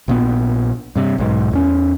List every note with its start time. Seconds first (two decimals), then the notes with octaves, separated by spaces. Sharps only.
0.08 A#1 A#2 B3
0.96 G2 C3
1.18 B1 G#2
1.51 E2 F#3 C#4